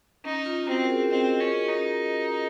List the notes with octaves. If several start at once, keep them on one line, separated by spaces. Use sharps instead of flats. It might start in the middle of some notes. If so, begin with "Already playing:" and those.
C#4 D#4
F4
C4 F#4
A#4
G#4
C4 D#5
C#4
D#4